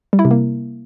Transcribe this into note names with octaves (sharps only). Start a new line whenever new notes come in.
G3
E4
C3
A#3